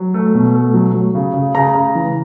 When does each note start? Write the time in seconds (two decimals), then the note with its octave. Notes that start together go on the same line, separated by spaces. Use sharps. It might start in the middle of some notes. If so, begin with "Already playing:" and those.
Already playing: F#3
0.14 A3
0.34 B2
0.54 A3
0.74 F#3
0.94 F#3
1.15 C#3
1.34 C#3
1.55 C#3 A#5
1.75 C#3
1.95 E3